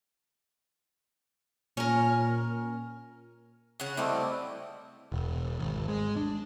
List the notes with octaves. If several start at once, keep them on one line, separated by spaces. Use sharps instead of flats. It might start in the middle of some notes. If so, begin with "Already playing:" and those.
A#2 C#4 A#4
C#3 C#5 F#5
G3 A3 C4 E4 D5 D#5
E1
G#1
G#3
D4